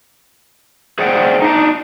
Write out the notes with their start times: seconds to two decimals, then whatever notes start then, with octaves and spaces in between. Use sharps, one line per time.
0.99 G#4 C5 D5 F#5 G5
1.42 D4 D#4